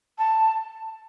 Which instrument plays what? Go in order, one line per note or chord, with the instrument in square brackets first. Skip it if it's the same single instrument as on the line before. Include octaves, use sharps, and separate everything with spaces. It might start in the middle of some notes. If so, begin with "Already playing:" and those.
[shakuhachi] A5